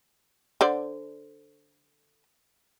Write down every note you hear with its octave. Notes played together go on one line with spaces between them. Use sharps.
D3 C5 D5